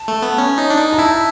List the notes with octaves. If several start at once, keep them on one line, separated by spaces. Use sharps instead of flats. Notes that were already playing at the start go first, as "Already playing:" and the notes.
Already playing: A5
A3
B3
C#4
D#4
D4
D#4
A#5
E4 A5